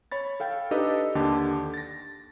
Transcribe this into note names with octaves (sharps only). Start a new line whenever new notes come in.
C#5 B5 A6
A4 F5 G5
D4 D#4 G4 A4 B4 D#5
D#2 D3 D4 G4 A5
A6 A#6